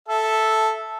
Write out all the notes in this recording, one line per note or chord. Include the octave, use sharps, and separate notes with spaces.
A4 E5